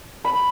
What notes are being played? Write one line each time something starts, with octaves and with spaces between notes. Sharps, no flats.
B5